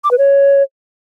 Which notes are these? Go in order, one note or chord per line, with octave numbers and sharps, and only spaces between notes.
D6
B4
C#5